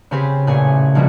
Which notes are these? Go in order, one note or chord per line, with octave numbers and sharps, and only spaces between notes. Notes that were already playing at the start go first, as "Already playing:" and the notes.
C#3 C4 G4 G#4 B4 C5
A1 A#2 A3 G#4 G#5
A#1 B2 F3 G3 G#3 F#4